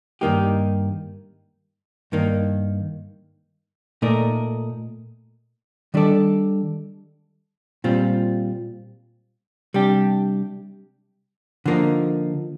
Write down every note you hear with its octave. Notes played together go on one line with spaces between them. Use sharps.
G2 D#3 A#3 D#4 G4
G2 D#3 A#3
A#2 A3 D#4 A#4 D5
D#3 G3 D4 A4 D5
A#2 G3 C4 F4
C3 G3 D4 G4
D3 F3 A#3 D#4